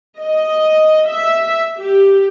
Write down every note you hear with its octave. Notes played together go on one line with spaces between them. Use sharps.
D#5
E5
G4